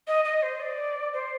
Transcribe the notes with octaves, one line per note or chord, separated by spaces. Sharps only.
D#5
D#5
C5
D5
C5